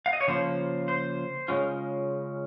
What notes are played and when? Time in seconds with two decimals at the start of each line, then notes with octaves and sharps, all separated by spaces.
0.06 F5
0.13 D#5
0.21 C#5
0.27 C#3 F3 A#3 C5
0.88 C5
1.48 C#3 G#3 C#4 F4